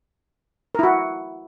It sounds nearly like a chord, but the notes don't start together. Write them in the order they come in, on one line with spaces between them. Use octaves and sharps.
A#4 E4 F#4